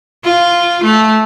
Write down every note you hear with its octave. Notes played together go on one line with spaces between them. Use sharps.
F4
A3